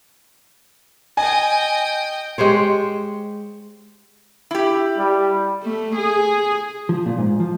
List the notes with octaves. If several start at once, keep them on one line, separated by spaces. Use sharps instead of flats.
D#5 G5 G#5
G#3 G4 C5 C#5
E4 G4
G3
A3
G#4
F3
A#2
G#2
F3